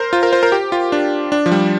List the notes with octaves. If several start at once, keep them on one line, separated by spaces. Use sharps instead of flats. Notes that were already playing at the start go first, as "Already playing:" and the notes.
Already playing: A#4 C5
F4
A#4
C5
A#4
G4
F4
D4
D4
F3
G3